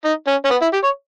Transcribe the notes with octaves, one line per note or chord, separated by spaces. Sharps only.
D#4
C#4
C#4
B3
E4
G4
C#5